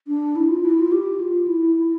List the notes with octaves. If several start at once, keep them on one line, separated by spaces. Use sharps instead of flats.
D4
E4
F4
E4
F4
G4
F4
E4
E4